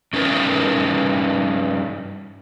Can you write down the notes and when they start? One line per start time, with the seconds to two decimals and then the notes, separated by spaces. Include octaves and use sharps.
0.13 G2 C#4 D#4 A#4 B4